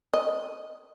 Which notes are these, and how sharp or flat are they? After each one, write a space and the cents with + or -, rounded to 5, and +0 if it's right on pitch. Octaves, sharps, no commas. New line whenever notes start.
D#5 +5